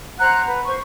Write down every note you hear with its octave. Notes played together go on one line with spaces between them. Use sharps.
C5 F#5 A#5 F#6
B4
C5 C#6